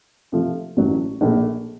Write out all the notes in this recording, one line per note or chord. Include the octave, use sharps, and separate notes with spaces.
C3 F3 A3
A1 A2 F#3
A#1 A#2 A3